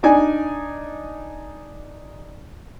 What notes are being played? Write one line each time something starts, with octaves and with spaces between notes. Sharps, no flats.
D4 D#4 D5 G#5